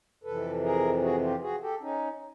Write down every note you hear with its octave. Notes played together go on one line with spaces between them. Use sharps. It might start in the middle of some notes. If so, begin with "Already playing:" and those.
F2 C3 E3 A4 B4
G#4 A#4
F#4 G#4
F4 G4
F#4 G#4
G4 A4
C#4 D#4